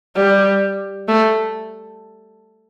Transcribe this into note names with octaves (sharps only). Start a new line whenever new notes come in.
G3
A3